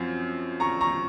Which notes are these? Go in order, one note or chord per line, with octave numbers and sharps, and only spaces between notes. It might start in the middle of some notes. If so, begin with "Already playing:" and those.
Already playing: F#2 F3 C4
A#5 C#6
A#5 C#6